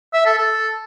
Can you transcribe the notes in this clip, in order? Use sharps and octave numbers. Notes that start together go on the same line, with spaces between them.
E5
A4
A4